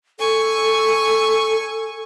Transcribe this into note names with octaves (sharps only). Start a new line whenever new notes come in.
A4 G#5 C#6